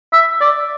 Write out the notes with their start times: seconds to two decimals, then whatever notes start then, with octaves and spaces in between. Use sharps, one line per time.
0.13 E5
0.41 D5